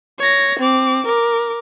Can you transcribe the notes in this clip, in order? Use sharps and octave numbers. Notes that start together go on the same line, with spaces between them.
C#5 A#6
C4 D6
A#4 D6